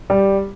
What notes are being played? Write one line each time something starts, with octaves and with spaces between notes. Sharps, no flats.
G3